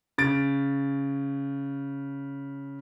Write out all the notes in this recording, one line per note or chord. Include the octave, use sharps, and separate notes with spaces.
C#3 A6 D7